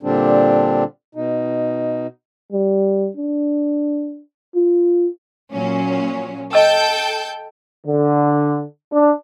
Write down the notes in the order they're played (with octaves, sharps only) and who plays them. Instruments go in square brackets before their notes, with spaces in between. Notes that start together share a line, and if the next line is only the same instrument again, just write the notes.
[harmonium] A#2 D3 G3 C4 D4
B2 D#4
[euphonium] G3
D4
F4
[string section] A#2 F#3 C#4
[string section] A4 G5 G6 [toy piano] D#5 A5 E6
[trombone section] D3
D4